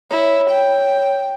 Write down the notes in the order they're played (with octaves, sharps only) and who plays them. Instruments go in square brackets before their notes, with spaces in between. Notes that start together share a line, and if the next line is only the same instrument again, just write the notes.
[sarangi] E4 [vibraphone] C#5
[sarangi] G5